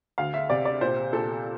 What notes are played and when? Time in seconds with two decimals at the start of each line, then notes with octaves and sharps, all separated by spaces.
0.18 D2 F5
0.34 E5
0.50 C3 D5
0.65 D5
0.81 A#2 C5
1.13 A#2 A4